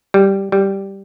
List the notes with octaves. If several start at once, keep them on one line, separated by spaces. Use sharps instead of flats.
G3
G3